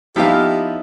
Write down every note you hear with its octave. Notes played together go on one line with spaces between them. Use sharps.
C#3 F3 B3 D#4 E4 G4 F5